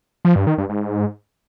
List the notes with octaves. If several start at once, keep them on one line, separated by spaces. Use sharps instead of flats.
F3
G2
D#3
G2
G#2